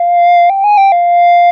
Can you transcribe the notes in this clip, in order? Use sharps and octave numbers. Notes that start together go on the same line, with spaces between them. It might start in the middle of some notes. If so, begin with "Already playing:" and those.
Already playing: F5
G5
G#5
G5
F5